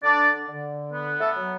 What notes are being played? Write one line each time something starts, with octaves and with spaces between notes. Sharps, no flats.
D3 D4 D5
D3
B3
A3 A4
F#3